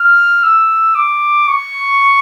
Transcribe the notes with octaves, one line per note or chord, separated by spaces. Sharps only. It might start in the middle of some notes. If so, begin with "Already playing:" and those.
Already playing: F6
E6
D6
C#6